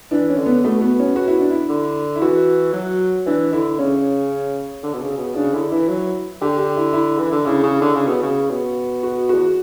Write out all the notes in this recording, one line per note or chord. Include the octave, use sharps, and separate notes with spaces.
E3 D4
C#4
D3
B3
B2 A3
B3
C#4
F#4
E4
D4
E4
D3
E4
E3 F#4
F#3
E3 D4
D3 E4
C#3 C#4
D3
B2
C#3
B2
C#3 D4
D3 E4
E3 E4
F#3
D3 G4
G4
E4
E4
E3
D3
C#3 E4
C#3
D3
C#3
B2
C#3
B2
F#4
E2 F#4